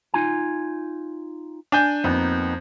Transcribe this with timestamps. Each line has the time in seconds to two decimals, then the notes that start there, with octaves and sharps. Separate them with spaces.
0.14 D#4 F4 G#5
1.72 D4 G#5 G6
2.04 F2 A#3 B3 D#4